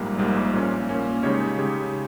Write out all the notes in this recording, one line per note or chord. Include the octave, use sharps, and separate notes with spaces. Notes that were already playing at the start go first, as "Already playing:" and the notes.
Already playing: A#1 G#2 G3 A#3
A#1 G#2 G3 A#3
A#2 A#3 C#4
A#2 A#3 C#4
C#3 G#3 D#4 G4 C#5
C#3 G#3 D#4 G4 C#5